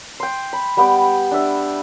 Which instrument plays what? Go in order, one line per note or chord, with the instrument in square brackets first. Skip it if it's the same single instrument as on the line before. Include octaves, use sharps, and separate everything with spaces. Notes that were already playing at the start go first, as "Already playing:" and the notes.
[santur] G5 C6
B5
G3 B3 G4 G5
D4 E5